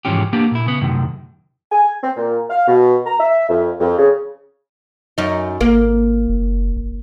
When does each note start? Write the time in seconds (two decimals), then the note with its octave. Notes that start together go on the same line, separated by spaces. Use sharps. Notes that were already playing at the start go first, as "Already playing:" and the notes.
0.05 C2 G#2 E3 F3 C#4 G4
0.33 A#3 B3 D4 G4
0.51 A#2 E4
0.66 C#3 B3
0.81 F#2 A2 C3 D#3
1.72 G#5
2.03 C4
2.17 A#2
2.50 F5
2.68 B2
3.06 A#5
3.20 E5
3.49 F2
3.80 F2
3.98 C#3
5.18 F#2 D#4
5.61 G#1 A#3
6.29 F#1
6.77 G1